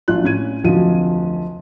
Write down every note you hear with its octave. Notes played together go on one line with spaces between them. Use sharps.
A#1 F#3 D4 F4 F#6
A2 C#4 G#6 D#7
F1 D2 F3 F#3 D#7